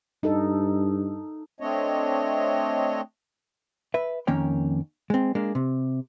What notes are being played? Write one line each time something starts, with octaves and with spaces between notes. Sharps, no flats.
G2 D#4 A4
A3 C4 D4 C#5 D#5
B4 E5
F2 D#3 A#3 C#4 C#5 G5
G#3 C4
G#3 A#3 D4
C3